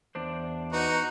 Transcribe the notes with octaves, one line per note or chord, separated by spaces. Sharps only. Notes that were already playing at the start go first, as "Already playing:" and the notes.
E2 D4 C5
D#4 F#4 B4 F#5 A#5